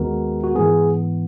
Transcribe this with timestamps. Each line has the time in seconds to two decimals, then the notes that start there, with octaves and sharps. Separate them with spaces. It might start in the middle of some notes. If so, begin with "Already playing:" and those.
Already playing: D#2 D#3 G#3 B3 F#4 A#4
0.44 F#4
0.55 G#2 E3 B3 G#4